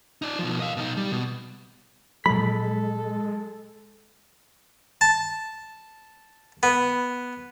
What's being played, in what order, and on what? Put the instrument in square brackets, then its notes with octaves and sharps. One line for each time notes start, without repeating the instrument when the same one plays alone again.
[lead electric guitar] D#4 D5
B2 F3
D#5 F5
B2 D#4
G3
B2
[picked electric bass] A#2 F3 F#3 [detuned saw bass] G#3 [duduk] A4 [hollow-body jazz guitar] B5
[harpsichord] A5
B3